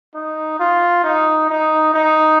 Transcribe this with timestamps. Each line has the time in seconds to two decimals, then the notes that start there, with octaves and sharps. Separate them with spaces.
0.14 D#4
0.59 F4
1.04 D#4
1.49 D#4
1.94 D#4